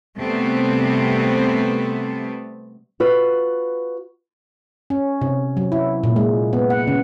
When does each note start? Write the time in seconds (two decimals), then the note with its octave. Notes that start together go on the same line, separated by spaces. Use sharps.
0.19 C3 G3 A3 B3 C4
3.00 F4 F#4 B4
4.90 C#4
5.22 C3
5.57 F#3
5.72 E4
6.04 A#2
6.16 G#3
6.53 B3
6.70 F#5
6.87 C#3